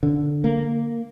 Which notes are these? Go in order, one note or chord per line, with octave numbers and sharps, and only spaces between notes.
D3
A#3